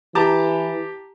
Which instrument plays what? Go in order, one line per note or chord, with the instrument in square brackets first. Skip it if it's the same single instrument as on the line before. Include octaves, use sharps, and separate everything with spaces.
[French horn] E3 [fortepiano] G4 A5 A#5